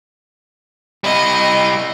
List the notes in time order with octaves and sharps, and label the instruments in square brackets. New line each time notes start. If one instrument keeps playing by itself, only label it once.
[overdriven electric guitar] G3 E4 [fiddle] D#5